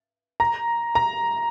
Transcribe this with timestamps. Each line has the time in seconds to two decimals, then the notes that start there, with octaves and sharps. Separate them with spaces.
0.40 A#5
0.95 A#5